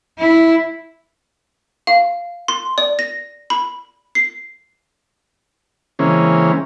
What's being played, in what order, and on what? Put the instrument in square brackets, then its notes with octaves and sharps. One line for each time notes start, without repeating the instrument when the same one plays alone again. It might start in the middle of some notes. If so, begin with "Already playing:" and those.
[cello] E4
[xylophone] F5
C6
D5
A#6
B5
C7
[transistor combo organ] C#3 E3 G#3 A#3 C4 C#4